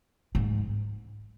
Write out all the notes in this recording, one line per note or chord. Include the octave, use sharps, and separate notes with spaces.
G#2